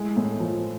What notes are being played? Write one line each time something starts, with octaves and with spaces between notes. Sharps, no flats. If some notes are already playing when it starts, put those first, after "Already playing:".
Already playing: G#3 A3 E4
A2
F3